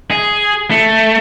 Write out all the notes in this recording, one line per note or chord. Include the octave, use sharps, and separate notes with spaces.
G#4
A3